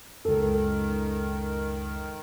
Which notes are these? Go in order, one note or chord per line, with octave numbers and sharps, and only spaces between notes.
C#2 F#2 D#3 A4